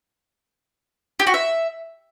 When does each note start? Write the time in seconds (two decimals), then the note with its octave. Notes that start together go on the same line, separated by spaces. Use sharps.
1.20 G4
1.27 F#4
1.34 E5